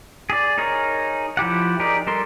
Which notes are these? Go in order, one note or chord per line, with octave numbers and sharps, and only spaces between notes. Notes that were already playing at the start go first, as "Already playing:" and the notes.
G#4 D5
D#4 G#4 A#4 C#5
F3 E4 G4 F#5
D#4 G4 G#4 A#4 D5
G3 A4 A#4 C6